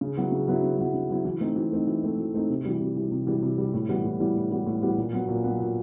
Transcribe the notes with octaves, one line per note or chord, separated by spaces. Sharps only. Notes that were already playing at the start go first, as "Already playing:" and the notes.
C#3
F#3 B3 E4
C#3
F#3 B3 E4
C#3
F#3 B3 E4
C#3
F#3 B3 E4
E3
A3 C4 D#4
E3
A3 C4 D#4
E3
A3 C4 D#4
E3
A3 C4 D#4
C3
E3 G3
C3
E3 G3
C3
E3 G3
C3
E3 G3
A2
E3 G3 B3
A2
E3 G3 B3
A2
E3 G3 B3
A2
E3 G3 B3
A#2
F#3 B3
A#2
F#3 B3
A#2